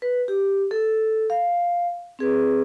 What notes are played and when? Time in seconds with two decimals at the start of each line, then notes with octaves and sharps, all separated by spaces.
0.02 B4
0.28 G4
0.71 A4
1.30 F5
2.19 C4 G#4 B4